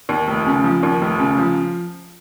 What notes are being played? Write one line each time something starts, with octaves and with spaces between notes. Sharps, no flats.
D#2
F1
C#3
F3
D#2
F1
C#3
F3